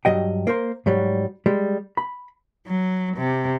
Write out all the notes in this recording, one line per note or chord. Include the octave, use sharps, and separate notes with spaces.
G2 F#3 D#5 G5
A#3 A#4 C5
G#2 F#3 G3
G3 G#3
B5
F#3
C3